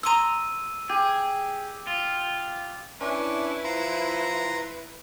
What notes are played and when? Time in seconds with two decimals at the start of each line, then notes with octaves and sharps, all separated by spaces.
0.03 A#5 C6 D#6 E6 D#7
0.89 G4 G#4
1.87 F4
3.01 C#4 D4 E4 B4
3.64 F3 A#5 C6